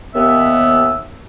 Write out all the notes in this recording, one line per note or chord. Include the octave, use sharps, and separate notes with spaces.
D#2 B3 E5